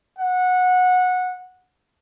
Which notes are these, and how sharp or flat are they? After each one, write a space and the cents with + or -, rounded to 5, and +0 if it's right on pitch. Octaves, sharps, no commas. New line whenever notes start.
F#5 -15